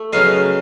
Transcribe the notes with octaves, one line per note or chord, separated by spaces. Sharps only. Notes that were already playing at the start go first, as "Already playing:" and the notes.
Already playing: A3
C#3 F#3 B3 D#5 F5